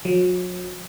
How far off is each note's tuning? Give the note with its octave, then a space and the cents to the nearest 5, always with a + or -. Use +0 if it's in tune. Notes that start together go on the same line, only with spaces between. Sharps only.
F#3 -40